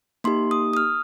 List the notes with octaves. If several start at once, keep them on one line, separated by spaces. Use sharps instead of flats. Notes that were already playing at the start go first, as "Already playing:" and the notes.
A#3 D#4 G4 C6
D#6
D#6
F6